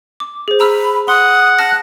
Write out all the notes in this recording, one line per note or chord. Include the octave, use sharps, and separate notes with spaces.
D6
G#4 C5
A#5 B5 E6 F6
F#5 C6 D#6
A5 F6 F#6 A#6